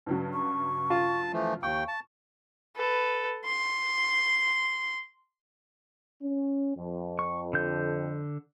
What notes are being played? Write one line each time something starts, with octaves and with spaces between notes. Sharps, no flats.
G2 C#3 F#3
C#6
F4 A5
E3 F3 A3
D#2 F5 G5 C#6
A5
A4 B4
C6
C#4
F2
C#6
D3 G6